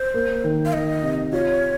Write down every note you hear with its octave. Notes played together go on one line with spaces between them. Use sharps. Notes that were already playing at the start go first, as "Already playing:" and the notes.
Already playing: C5
A#3
D#3
F5
D#3 D#5
C3
F4 C#5